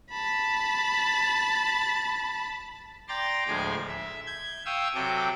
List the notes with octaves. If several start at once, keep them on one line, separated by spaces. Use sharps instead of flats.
A5 B5
D5 G5 A#5 C6 A6
D2 A2 F3 G#3 G#5 D6
E5
G6 G#6
F5 G5 C#6 D#6 E6
C3 F#3 A4 G5 D6